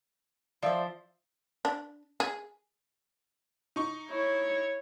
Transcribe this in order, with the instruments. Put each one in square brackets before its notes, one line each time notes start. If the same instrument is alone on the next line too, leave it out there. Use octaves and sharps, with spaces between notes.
[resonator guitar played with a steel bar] F3 C5 [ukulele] D5 E5
[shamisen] D4
G#4
[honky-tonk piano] D#4 C#6
[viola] E4 C#5